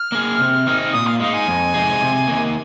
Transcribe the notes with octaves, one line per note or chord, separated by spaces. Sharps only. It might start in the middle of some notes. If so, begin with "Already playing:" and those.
Already playing: F6
A#3 G#4
C3
D#3 C4 D#4 G#4
A#2 D#6
F5
G#3 D#4 F5
G#5
F2
C3 G#3 D#4 G#4
C3
D#3 A#3